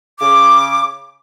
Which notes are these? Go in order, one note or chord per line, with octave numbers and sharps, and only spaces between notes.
C#3 D6